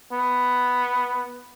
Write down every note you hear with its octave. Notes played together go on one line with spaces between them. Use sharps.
B3